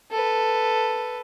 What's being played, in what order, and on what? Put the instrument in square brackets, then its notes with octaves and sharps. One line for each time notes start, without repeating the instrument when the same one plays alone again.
[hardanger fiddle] A4 B4